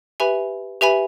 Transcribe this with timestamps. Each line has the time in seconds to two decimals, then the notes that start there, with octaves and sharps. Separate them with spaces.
0.20 G4 B4 E5 G#5 B5
0.81 G4 B4 E5 G#5 B5